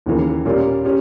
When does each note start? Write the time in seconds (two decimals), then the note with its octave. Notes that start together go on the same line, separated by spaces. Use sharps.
0.06 D#2 C#3 E3 A#3
0.45 A#2 G3 A#3 C#4
0.85 C#4 G4